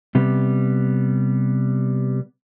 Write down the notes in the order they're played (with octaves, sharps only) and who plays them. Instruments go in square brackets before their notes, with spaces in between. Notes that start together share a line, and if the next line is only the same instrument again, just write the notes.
[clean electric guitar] C3 G3 B3